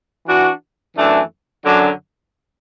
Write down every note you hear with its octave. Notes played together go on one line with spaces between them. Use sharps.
E3 D4 F#4
F#2 E3 A3 D4
F#2 D3 F#3 D4